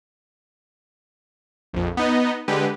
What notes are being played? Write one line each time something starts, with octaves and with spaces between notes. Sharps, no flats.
A#1 F2
B3 D#4 D#5
D3 G#3 G4 B4